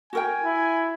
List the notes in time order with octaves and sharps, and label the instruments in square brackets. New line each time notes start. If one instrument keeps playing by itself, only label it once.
[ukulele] F#4 A#4 G5 [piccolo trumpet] G#5
[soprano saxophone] E4